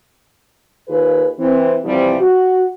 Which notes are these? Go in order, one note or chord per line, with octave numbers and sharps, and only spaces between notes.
D#2 D#3 F4 G#4 B4
E3 C4
C3 E3 F3 G3 C4
F#4